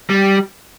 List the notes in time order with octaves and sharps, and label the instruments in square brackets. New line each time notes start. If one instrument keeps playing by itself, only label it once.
[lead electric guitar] G3